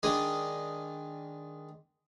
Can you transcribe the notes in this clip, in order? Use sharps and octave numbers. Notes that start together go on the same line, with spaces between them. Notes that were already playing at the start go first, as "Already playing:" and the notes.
D#3 G#3 D4 G#5 D#6